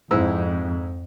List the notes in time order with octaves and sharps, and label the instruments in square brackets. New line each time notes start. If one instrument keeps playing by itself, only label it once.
[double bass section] F2 [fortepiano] G#2 E4 E6